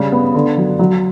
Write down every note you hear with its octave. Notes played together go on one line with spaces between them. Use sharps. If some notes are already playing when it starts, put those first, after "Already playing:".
Already playing: C#3 G3
B3
D3
F#3
F#3